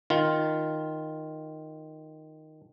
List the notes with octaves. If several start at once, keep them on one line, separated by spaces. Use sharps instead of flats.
D#3 F4